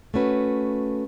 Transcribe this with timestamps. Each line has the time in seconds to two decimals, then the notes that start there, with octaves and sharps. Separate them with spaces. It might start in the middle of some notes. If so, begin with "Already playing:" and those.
0.14 A3 C#4 F#4 B4